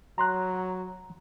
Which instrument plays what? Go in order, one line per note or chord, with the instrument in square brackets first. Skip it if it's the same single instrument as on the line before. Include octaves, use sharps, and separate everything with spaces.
[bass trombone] F#3 [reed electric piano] A#5 C6 F#6